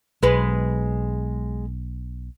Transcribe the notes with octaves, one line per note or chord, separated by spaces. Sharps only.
B1 G#3 B4